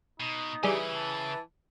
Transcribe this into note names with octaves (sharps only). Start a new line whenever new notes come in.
B2 D#4
C#3 E3 G3 G#4
A5